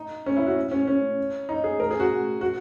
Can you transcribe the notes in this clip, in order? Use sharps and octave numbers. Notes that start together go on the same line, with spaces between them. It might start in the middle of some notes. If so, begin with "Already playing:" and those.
Already playing: D#4
C#4
E4
F#4
C#4
C#4
D#4
G#4
A#4
G#4
F#4
F#4